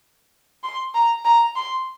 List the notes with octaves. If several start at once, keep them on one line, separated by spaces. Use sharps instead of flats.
C6
A#5
A#5
C6